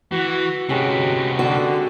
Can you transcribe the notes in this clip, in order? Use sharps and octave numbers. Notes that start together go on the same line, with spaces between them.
E3 F#4
C3 G#3 B3 C#4 F#4 G4
D3 F#4